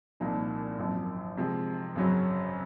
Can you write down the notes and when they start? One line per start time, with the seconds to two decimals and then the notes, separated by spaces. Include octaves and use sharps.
0.20 C2 A#2 F3 A#3 D#4
0.79 G#1 F#2 F3
1.37 C3 F3 G#3
1.95 G#1 F#2 C#3 F#3 C#4